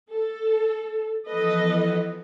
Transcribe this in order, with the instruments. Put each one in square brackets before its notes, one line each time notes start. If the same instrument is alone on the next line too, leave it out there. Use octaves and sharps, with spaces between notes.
[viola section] A4
[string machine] E3 F3 B3 [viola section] A4 B4 D#5